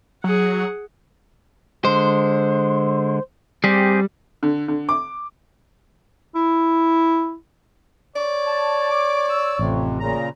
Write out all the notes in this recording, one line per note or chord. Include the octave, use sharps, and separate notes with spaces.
F#3 G#4 F#5
D3 G#3 C5
G3 C4 G4 G#4
D3
D3
D6
E4
C#5 D5
A5
D6
E6
A1 F2 C3
A#2 C#3 A#5